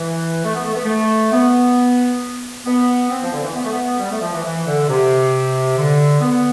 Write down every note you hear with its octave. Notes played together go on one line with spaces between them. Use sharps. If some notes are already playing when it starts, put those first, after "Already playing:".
Already playing: E3
A3
B3
A3
B3
A3
B3
B3
C4
F3
D3
E3
B3
A3
B3
G3
A3
F3
E3
E3
D3
C3
D3
B3